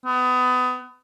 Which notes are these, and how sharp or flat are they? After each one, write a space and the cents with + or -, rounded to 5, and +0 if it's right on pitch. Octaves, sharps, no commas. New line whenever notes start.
B3 +25